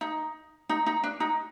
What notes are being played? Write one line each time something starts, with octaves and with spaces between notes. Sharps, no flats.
D#4
D#4
D#4
D4
D#4